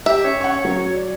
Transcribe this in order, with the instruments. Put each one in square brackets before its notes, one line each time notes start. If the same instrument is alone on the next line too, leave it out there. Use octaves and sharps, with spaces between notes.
[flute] G4 [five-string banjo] E5
[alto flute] C#4 [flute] C#5
[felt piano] F#5 C#6
F#3
[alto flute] D5